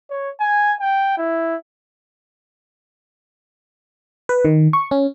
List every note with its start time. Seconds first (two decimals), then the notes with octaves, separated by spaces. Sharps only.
0.10 C#5
0.40 G#5
0.80 G5
1.18 E4
4.29 B4
4.45 D#3
4.73 C#6
4.91 C#4